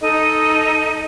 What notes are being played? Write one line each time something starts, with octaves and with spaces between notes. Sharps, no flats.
D#4 A4 D#5